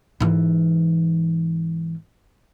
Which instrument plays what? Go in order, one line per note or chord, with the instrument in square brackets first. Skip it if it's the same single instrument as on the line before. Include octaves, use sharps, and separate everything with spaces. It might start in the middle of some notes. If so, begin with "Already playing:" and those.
[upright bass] G#2 E3